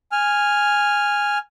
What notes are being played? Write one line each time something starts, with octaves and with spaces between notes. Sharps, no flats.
G#5 F6